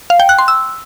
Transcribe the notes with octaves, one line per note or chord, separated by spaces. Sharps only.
F5
G5
F#6
C6
E6